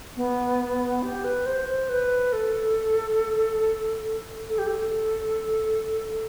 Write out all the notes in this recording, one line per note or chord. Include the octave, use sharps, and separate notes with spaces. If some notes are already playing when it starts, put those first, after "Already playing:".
B3
G4
B4
C5
C5
B4
A4
A4
G4
A4